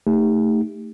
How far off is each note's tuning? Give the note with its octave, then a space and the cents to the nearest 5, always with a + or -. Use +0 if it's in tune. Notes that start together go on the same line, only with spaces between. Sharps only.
A3 +10 D#4 +0 G4 +30